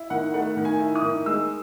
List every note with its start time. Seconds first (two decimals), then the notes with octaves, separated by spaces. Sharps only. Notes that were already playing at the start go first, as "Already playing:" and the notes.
Already playing: E4
0.10 D#3 F#5
0.34 A3 F#5
0.57 D#3
0.65 G#5
0.80 E4
0.95 D#6
1.02 D#3
1.26 G#3 E6